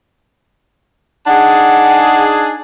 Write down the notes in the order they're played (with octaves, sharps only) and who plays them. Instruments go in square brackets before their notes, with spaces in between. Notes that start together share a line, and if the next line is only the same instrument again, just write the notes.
[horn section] D4 D#4 G#4 [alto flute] F#5